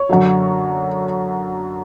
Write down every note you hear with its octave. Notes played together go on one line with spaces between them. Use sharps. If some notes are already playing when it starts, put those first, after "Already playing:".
Already playing: C#5
F#2 D3 F#3